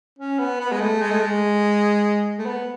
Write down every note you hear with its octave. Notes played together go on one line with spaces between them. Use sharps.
C#4
B3
B3
G#3
A3
G#3
A3
G#3
A3
B3